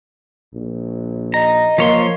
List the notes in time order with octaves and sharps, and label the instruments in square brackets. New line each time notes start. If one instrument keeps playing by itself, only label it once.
[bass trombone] A#1
[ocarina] D#5 [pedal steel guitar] A#5
[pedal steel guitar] F3 C#5 C6 [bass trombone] A#3